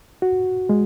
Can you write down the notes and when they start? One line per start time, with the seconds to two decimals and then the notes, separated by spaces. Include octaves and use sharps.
0.22 F#4
0.69 G#3